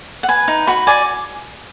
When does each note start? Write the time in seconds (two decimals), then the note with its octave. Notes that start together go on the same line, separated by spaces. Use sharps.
0.23 F#5
0.29 B4 G#5
0.48 D#4
0.67 F#4 B5
0.87 D5 G#5